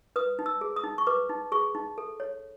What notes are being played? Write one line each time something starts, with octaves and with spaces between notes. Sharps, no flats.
B4 D#6
D#4
E6
G#4
D#6
D#4
C#6
B4 D6
D#4
G#4 C#6
D#4
A4
C#5